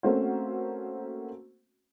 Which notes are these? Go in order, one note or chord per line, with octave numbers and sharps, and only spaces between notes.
A3 A#3 C4 C#4 F#4 C5